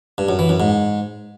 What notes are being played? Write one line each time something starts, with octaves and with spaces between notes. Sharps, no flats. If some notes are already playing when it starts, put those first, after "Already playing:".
G2
F#2
E3
F#2
G#2